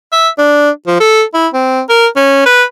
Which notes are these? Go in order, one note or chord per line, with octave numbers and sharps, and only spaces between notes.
E5
D4
F3
A4
E4
C4
A#4
C#4
B4